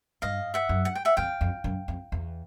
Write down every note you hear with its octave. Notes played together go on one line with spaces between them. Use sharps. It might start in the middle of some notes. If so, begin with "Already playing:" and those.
G2 D#5 F5
E5 F#5
F#2
F#5
G5
E5 F#5
F2 F5 G5
F2
F#2
F2
E2